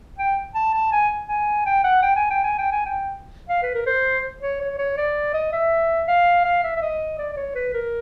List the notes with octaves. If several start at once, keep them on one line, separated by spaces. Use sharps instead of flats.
G5
A5
A5
G#5
G#5
G5
F#5
G5
G#5
G5
G#5
G5
G#5
G5
F5
B4
A#4
C5
C#5
C#5
C#5
D5
D#5
E5
F5
F5
E5
E5
D#5
D5
D5
C#5
B4
A#4